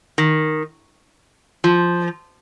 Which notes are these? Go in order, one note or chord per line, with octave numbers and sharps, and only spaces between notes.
D#3
F3